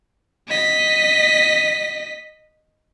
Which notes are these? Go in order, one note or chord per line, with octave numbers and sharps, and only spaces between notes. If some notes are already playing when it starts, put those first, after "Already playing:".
D#5 B6